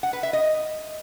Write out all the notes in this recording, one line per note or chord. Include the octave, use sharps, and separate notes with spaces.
F#5
B4
E5
D#5